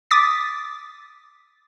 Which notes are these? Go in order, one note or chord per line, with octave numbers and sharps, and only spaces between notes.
D6 D#6 A6 B6